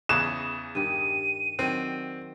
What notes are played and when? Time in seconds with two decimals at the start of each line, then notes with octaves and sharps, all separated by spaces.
0.09 E2 C#3 F#6 E7
0.75 G2 D#3 G4 D#7
1.59 D#3 F#3 C4 D4